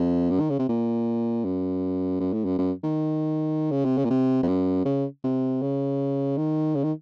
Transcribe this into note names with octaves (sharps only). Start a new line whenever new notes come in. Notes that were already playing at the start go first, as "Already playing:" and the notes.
Already playing: F2
F#2
D#3
C#3
C3
A#2
F#2
F#2
A2
F#2
F#2
D#3
C#3
C3
C#3
A#2
C3
F2
F#2
C#3
C3
C#3
D#3
C#3
D#3